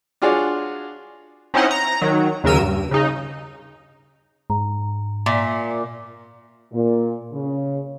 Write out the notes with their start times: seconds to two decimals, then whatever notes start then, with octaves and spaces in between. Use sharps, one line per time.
0.22 D4 F4 F#4 G#4 C#5 D5
1.54 C4 C#4 D#4 E4 D#5 F#5
1.71 A#5
2.02 D#3 F#3
2.44 D#2 C#3 F#3 A#4 E6 D#7
2.61 G2
2.91 C#3 D#4
4.50 G#2 A#5
5.26 A#2 E5 G#5 B6
6.72 A#2
7.32 C#3